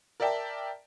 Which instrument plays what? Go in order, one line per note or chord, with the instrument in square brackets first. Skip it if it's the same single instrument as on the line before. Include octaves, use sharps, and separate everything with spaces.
[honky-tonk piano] A#4 D5 E5 G5 A5